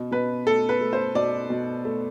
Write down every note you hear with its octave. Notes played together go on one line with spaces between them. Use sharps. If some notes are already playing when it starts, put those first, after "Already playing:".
Already playing: B2
B2 B4
A3 A4
B4
A3
C5
B2 D5
B2
A3